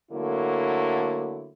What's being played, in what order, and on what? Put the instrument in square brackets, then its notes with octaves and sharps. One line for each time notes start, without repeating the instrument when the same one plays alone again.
[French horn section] D3 F#3 A3 A#3 E4